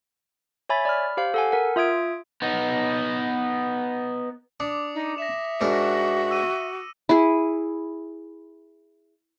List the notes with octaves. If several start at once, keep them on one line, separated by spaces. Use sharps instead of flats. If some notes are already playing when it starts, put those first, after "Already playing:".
C#5 E5 G#5 B5 A6
D5 B5 F6
G4 C5 F5
A4 F#5 G#5
A#4 F#5
F4 E5 D#6 G#6 D7
B3 D#4
D4 D6 D#6 C#7
D#4
E5 A#6 E7
G#2 D4 F#4 A#4 C#7
E6 D#7
E4 G#4